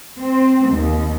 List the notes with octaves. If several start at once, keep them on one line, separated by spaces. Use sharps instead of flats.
C4
D#2